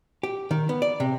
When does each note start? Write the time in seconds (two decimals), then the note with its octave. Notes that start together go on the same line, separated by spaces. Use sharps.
0.23 G4
0.51 D#3
0.69 B3
0.82 D5
1.00 C3